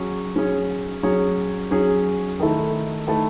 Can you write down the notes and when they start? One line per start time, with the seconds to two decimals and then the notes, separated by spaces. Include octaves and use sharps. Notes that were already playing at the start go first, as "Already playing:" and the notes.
Already playing: F#3 C#4 G#4 C#5
0.35 F#3 C#4 G#4 C#5
1.03 F#3 C#4 G#4 C#5
1.71 F#3 C#4 G#4 C#5
2.40 D#3 A3 E4 A4
3.07 D#3 A3 E4 A4